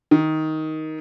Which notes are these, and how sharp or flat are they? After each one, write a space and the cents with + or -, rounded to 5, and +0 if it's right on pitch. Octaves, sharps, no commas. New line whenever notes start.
D#3 +10